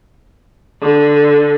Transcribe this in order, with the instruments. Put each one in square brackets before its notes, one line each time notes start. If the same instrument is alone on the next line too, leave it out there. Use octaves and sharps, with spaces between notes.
[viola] D3